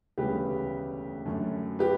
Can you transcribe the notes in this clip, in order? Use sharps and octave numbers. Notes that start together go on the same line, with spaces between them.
E1 D2 C#3 G3 B3 G4 B4
F#2 D3 A3
G4 B4